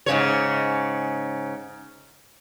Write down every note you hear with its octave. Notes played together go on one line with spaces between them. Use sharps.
G#2 C#3 C#5